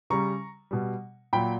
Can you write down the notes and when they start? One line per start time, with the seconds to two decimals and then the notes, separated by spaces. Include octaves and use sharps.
0.10 C#3 G3 A#5 C#6
0.71 B2 G3
1.33 A#2 F#3 G5 B5